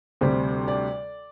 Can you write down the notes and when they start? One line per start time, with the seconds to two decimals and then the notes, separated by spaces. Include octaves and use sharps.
0.21 D2 C3 G3 C5
0.68 D5